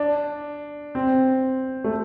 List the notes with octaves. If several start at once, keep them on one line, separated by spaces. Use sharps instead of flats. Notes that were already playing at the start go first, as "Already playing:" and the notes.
Already playing: D4
C4
A3